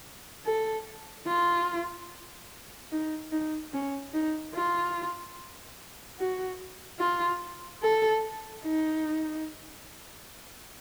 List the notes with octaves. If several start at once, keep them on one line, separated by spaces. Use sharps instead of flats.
A4
F4
D#4
D#4
C#4
D#4
F4
F#4
F4
A4
D#4